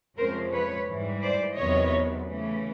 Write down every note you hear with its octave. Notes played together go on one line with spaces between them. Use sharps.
F2 C3 F3 G#3 C#4 A#4 C5
B4 C#5
G#2 E3 G3
C5 D5
E2 C3 D#3 F#3 B3 C#5 D#5
C#3 E3 A3 C#4